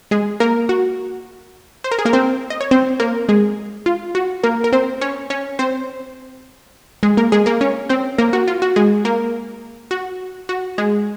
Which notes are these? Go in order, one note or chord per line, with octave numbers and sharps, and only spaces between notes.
G#3 G#4
A#3 A#4
F#4
C5
A#4
G#4
A#3 A#4
C4 C5
D#5
C#5
C4 C5
A#3 A#4
G#3 G#4
F4
F#4
A#3 A#4
A#4
C4 C5
C#4 C#5
C#4 C#5
C4 C5
G#3 G#4
A#3 A#4
G#3 G#4
A#3 A#4
C#4 C#5
C4 C5
A#3 A#4
F#4
F4
F#4
G#3 G#4
A#3 A#4
F#4
F#4
G#3 G#4